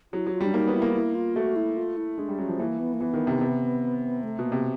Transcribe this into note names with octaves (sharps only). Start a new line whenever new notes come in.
F#3 E4
F#3
F4
G3 D4
A#3 D#4
B3
E4
A#3
E4
F4
A3 F#4
E4
F4
E4
G#3 D4
G3
F#3 C#4
F3
E3 A#3
B3
A#3
E3 B3
D#3
C3
C3
A3
B2
A#3
C3